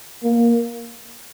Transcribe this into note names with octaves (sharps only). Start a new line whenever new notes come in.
A#3